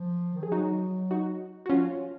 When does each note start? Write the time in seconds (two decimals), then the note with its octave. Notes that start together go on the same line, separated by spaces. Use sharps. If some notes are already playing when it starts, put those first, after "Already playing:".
Already playing: F3
0.35 D#3
0.43 F3 G#4
0.52 F#3 D#4 F#4
1.11 D#4 F#4
1.66 F#4
1.70 F3 C#4 F4